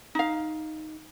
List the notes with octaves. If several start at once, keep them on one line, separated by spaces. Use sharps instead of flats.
D#4 F5